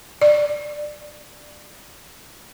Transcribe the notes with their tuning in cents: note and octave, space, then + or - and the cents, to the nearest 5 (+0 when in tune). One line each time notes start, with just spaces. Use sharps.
D5 +20